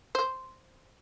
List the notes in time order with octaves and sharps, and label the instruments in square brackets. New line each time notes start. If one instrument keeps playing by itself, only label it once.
[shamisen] C5